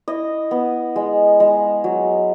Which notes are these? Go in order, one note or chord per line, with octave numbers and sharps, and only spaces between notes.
E4 D#5
B3
G#3
G#3
F#3